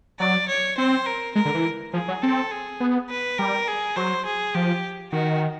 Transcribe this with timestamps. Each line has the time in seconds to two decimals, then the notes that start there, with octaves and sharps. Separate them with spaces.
0.19 F#3 D5
0.48 C#5
0.77 C4 C5
1.06 A#4
1.35 G#3 A#4
1.45 D3
1.55 E3
1.93 F3 G#4
2.08 F#3
2.22 C4 A4
2.52 G#4
2.80 B3
3.10 B4
3.38 G3 A#4
3.68 G#4
3.96 F#3 C5
4.26 G#4
4.55 F3 G4
5.12 D#3 F#4